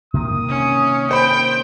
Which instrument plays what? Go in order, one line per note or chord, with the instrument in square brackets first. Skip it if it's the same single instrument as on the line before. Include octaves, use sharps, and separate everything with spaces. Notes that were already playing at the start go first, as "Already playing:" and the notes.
[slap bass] C3 D#3 A#3 [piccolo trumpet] D#6
[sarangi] C#4
[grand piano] C5 B5 [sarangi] G5